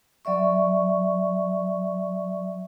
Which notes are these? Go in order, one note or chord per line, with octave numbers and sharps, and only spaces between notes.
F#3 D5 E5 C#6